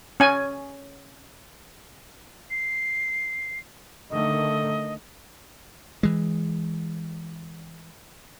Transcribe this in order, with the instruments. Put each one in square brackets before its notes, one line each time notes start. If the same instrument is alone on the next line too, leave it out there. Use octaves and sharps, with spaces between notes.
[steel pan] C#4 G#5
[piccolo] C7
[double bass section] D3 D#3 A3 [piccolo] D#5
[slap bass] E3 G#3